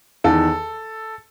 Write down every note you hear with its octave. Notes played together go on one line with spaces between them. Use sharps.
E2 D#3 A4